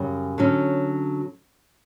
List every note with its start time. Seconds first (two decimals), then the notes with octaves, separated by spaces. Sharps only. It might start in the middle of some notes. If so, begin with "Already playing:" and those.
Already playing: F#2 C#3 G3
0.38 D3 F#3 C#4